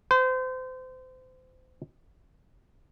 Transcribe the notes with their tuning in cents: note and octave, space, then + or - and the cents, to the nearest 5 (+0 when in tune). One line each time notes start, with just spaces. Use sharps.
C5 -30